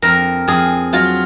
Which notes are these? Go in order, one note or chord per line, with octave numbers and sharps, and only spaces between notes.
F2 A#4
F2 G#4
F#3 F4